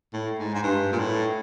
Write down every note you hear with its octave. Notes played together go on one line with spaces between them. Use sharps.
A2
G#2
G#2
G2
A#2
A2